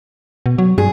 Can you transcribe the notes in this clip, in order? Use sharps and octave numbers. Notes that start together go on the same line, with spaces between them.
B2
F#3
G2 G#4